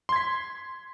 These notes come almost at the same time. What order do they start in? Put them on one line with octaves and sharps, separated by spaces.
C6 G#6 B6